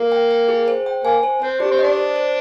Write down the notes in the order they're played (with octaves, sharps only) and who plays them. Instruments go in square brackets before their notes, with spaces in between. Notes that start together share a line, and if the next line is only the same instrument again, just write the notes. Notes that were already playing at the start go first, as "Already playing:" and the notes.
Already playing: [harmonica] A#3
[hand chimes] G5
G5
G#4
C5
G5
[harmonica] A#3 [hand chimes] G#5
[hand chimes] C5
[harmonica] C4 [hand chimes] C5
[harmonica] D4 [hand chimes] G4
[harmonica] C4
[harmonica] D4 [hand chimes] D#5
[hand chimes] C5
C5